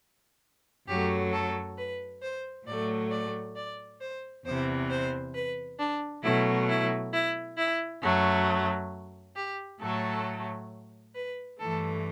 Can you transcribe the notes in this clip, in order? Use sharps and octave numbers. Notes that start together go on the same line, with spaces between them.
F#2 F#3 A3 G4
A4
B4
C5
A2 F#3 A3 D5
D5
D5
C5
E2 C3 E3 C5
C5
B4
D4
B2 F#3 A3 E4
E4
E4
E4
F#2 F#3 A3
G4
A2 F#3 A3 A4
B4
G2 E3 A3 A4